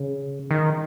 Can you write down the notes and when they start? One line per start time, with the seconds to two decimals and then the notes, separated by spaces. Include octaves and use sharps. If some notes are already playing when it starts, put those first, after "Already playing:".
Already playing: C#3
0.51 D#3